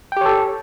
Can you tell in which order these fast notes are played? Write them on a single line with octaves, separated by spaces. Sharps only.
G5 G4 C#5 A4